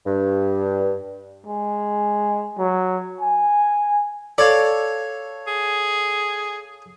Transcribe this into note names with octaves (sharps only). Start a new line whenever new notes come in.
G2
G#3
F#3
G#5
A4 C#5 D5 F5
G#4